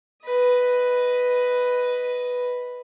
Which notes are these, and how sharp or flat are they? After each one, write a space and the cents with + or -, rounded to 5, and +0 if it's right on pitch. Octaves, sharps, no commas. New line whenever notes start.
B4 +0 D#5 +0